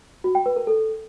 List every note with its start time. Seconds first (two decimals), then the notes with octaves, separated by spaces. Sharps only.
0.24 F#4
0.35 G5
0.46 B4
0.56 A#4
0.67 A4